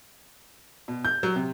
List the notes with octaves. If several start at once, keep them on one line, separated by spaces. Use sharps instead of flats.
B2
G6
F#3
C3